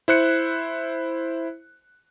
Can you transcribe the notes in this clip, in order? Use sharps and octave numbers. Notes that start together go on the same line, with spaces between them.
E4 C5 F#6 C#7